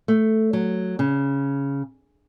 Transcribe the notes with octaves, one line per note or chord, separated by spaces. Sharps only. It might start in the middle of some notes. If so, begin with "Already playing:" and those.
A3
F#3
C#3